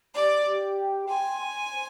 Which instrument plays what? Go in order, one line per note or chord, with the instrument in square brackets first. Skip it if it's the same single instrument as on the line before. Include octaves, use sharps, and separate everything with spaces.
[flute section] G4 [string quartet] D5
[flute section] G4
G5
[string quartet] G#5 [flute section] C6
[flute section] C6
C5